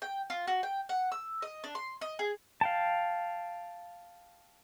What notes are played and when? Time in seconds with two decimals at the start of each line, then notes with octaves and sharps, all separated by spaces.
0.02 G5
0.30 F4
0.47 F#4
0.63 G5
0.89 F#5
1.12 E6
1.42 D#5
1.64 D4
1.75 C6
2.01 D#5
2.19 G#4
2.61 F5 G5 A5